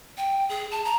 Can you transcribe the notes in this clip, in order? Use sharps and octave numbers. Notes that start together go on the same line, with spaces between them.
G5
G#4
A5
A#5